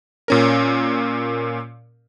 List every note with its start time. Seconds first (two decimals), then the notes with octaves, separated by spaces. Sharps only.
0.28 A#2 C#4 A#4